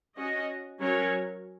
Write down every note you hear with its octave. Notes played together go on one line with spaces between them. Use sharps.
C#4 F#4 D#5
F#3 C#4 A#4 C#5